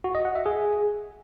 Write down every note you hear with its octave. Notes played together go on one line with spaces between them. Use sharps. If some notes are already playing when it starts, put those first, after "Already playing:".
F#4
D#5
F#5
E5
G#4